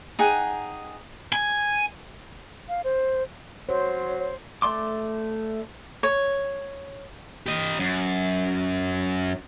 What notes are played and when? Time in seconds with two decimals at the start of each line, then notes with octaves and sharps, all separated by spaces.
0.19 D#4 G#4 F#5 G5
1.32 G#5
2.69 F5
2.84 C5
3.69 F#3 C5 C#5
4.62 A3 D5 C6 D6
6.03 C#5
7.46 G4 D#5
7.79 F#2